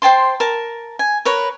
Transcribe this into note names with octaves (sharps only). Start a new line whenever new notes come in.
C5 G5 A5 C6
A#4 A5
G#5
A#4 B4 C#5